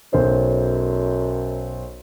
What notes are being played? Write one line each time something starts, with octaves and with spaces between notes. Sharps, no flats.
B1 F#2 C5